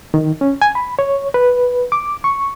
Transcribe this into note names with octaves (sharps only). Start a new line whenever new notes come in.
D#3
C#4
G#5
B5
C#5
B4
D6
C#6